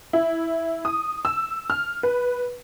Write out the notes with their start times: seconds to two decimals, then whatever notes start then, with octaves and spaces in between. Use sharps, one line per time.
0.13 E4
0.85 D#6
1.25 E6
1.70 F6
2.03 B4